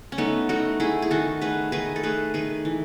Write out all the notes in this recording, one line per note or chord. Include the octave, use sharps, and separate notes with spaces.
C#4
A3 B3 D#4
A3 D#4 F#4
A3 E4 G#4
G#4
D#3 F#4 A4
A3 G#4 B4
D#3 G#4 B4
A4
A3 G#4 B4
D#3 G#4 B4
E3